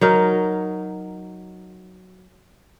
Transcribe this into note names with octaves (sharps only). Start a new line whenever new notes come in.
F#3 D#4 A#4